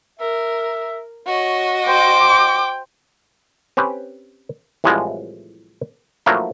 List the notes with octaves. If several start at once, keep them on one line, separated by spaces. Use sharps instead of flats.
A#4 E5
F#4 C#5 D#5
C5 G5 D6
C4 C#4 G4 B4
C2 A2 C3 E3 F3 G#3
F3 F#3 A3 A#3 D4 E4